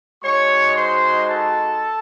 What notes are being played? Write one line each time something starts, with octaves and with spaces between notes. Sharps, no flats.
G#3 D#4 F#4 C#5 C#6
C5 C6
A4 A5